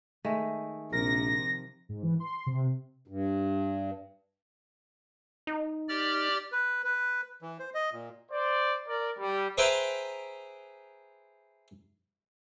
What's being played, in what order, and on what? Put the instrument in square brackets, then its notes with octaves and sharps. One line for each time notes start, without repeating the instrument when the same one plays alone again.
[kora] D#3 G#3 A3
[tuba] A#1 [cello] C3 F3 [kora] A#4 [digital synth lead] A#6
[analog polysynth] G#2
E3
C6
C3
[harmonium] G2
[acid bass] D#4
[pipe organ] G4 D5 F6
[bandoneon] B4
B4
E3
C5
D#5
A#2
[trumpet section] C5 D5
A#4 D5
G3
[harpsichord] G#4 B4 C5 E5 G5 A#5